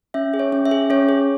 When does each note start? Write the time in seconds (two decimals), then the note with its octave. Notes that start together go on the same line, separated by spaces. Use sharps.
0.14 C#4 E5
0.34 G#4
0.39 C#5
0.52 C#4
0.65 E5
0.71 G#4
0.90 C#4 C#5
1.09 G#4